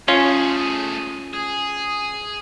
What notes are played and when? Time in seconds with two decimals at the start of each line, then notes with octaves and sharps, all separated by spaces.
0.08 A3 C#4 F4 G#4
1.33 G#4